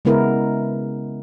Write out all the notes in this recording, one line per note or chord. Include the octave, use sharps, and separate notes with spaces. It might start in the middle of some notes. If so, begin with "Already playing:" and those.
C#3 G#3 B3 E4 A#4